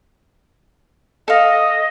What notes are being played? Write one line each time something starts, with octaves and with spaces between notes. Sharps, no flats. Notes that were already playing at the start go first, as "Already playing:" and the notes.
A4 D#5 F5